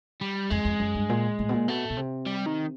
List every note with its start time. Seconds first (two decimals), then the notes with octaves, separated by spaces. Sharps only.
0.21 G3
0.50 F2 G#3
0.65 F2
0.80 F#2
0.95 G2
1.09 A#2
1.39 A2
1.49 B2
1.54 A#2
1.68 B2 A3
1.90 B2
1.97 C3
2.27 G3
2.46 D#3